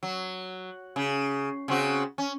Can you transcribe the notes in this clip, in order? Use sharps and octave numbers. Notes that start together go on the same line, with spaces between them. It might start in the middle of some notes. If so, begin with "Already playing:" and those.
F#3
C#3
C#3 C4 F#4
C#4